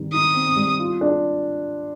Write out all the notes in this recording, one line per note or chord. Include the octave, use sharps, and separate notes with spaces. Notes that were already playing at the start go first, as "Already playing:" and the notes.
Already playing: D#3 G3 C4
D#4 D#6
C4
G3
F4
D4